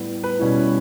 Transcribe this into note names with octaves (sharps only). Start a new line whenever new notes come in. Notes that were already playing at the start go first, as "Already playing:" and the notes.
Already playing: A2 G3 B3
B4
B2 G3 C#4 E4